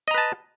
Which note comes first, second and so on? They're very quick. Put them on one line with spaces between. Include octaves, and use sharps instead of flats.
D#5 A#5 B4 A5